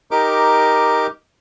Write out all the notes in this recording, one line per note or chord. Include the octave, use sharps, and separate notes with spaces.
D#4 G4 A#4 D6